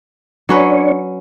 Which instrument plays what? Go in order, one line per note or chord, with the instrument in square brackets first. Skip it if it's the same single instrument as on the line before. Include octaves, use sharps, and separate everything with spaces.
[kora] F#3 C#4 B4 [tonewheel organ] D4 C#5